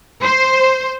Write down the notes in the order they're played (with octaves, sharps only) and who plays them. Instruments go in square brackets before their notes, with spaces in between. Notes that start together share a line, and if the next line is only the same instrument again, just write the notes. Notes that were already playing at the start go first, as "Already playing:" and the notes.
[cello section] C5